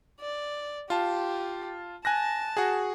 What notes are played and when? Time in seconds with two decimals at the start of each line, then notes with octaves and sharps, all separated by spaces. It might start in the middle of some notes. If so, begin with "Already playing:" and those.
0.20 D5
0.90 F4 G4 A5
2.05 G#5 A5 F#6 A#6
2.57 F#4 G#4